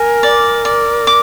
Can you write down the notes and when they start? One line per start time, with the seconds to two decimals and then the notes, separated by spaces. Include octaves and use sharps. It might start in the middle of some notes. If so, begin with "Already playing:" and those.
Already playing: A#4 G#5
0.23 D5
0.65 D5
1.07 D6